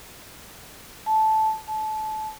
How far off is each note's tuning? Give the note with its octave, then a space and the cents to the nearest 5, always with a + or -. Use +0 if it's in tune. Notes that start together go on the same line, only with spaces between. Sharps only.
A5 -10
A5 -25